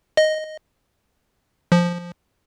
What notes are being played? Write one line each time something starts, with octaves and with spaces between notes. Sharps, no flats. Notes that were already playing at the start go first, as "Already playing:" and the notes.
D#5
F3